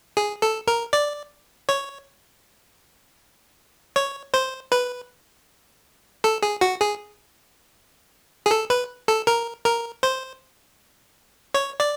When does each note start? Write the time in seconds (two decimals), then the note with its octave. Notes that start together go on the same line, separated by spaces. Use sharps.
0.17 G#4
0.42 A4
0.67 A#4
0.93 D5
1.69 C#5
3.96 C#5
4.34 C5
4.72 B4
6.24 A4
6.42 G#4
6.61 F#4
6.81 G#4
8.46 G#4
8.51 A4
8.70 B4
9.08 A4
9.27 A#4
9.65 A#4
10.03 C5
11.55 C#5
11.80 D5